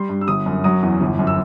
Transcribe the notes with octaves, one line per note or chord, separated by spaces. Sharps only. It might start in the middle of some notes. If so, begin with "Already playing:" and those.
Already playing: G3 C6
G2
E6
G1 D#6
F#2
F#3 D#6
E2
G1
F#2
E6